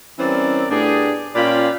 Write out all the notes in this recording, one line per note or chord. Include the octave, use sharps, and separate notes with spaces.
E3 G3 C4 C#4 A#4 D5
A2 A3 B3 D4 G4 G#4
A#2 C#4 F4 D5 G5 B5